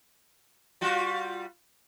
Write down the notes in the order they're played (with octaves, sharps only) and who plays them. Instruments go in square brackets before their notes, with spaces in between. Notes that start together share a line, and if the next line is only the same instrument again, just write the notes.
[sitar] G3 F4 F#4